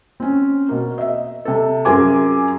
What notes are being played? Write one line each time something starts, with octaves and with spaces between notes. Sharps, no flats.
C4 C#4
B2 A#3
D#5 E5
C3 A4
F#2 F4 G#4 A#4 G#5 D6